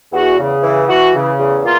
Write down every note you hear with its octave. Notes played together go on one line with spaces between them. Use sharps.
E2 F#4
C#3
E3
E3 F#4
C#3
E2
A#3 F4